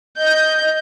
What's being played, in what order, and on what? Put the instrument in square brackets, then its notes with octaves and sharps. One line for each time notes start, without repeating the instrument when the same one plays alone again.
[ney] D#5 [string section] G6